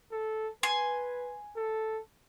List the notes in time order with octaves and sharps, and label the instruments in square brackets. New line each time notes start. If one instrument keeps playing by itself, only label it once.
[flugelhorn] A4
[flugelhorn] B4 [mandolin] G#5 C6
[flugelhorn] A4